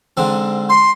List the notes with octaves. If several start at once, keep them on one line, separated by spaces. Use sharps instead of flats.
G#2 D3 C4
C6